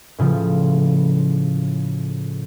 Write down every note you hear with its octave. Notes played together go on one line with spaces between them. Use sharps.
A2 C#3 F3